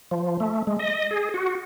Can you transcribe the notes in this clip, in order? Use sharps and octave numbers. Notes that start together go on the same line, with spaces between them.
F3
A3
G#3
D#5
G#4
F#4